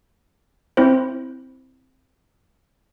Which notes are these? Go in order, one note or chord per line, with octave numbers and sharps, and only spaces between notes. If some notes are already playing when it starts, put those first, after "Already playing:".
C4 E4 C5